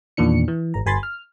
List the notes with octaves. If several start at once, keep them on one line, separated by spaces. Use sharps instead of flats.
E2 A#2 D#3 D4 C#7
E3
G#1 A#5
G1 G#5 B5 C6 A6
F6